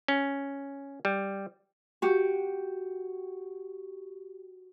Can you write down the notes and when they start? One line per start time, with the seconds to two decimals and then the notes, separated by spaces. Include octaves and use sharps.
0.08 C#4
1.05 G3
2.02 F#4 G4